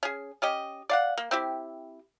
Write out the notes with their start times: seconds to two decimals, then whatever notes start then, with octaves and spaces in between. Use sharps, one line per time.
0.03 C#4 G#4
0.42 C#4 G4 D#5
0.89 D5 F5 F#5
1.18 A#3
1.31 C4 E4 G4